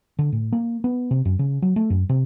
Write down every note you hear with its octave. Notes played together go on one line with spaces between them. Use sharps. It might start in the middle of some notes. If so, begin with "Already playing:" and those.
D3
A2
A#3
B3
C3
F#2
C#3
F#3
A3
F#2
C3